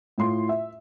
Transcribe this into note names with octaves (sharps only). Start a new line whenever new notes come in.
A2 E4 F4 C6
E5